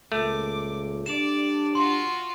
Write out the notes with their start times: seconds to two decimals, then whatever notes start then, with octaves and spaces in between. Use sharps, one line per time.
0.12 C#2 A#2 A3 D6
1.06 G3 D4 D5 D6 E7
1.75 F4 F#4 C6